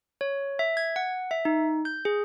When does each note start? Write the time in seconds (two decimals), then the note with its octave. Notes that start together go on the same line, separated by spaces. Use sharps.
0.21 C#5
0.59 E5
0.77 G#6
0.96 F#5
1.31 E5
1.45 D#4
1.85 G6
2.05 G#4